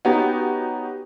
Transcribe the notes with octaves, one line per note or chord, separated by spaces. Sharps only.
B3 C#4 D#4 F#4 G4